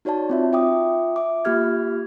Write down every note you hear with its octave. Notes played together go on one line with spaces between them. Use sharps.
D#4 F#4 C#5 D5 A5
C4 F4 E5
F4 E5 G5 D6 D#6
E5 D6
A#3 F4 G4 F6 G#6